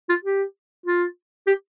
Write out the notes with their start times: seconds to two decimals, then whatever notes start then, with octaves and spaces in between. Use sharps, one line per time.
0.09 F4
0.24 G4
0.86 F4
1.47 G4